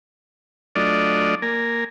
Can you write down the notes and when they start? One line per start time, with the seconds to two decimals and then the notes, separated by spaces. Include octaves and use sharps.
0.75 F#3 A3 D4 F4 D5 D#5
1.42 A#3 A#4 G#5